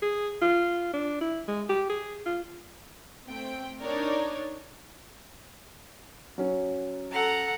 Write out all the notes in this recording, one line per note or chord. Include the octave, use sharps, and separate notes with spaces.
G#4
F4
D4
E4
G#3
G4
G#4
F4
A3 C4 G5
D4 D#4 A#4 C#5 D5
F#3 C#4
A4 F#5 A#5